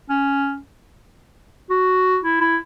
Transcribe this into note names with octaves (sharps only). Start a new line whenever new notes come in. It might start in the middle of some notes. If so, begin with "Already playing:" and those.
C#4
F#4
E4
E4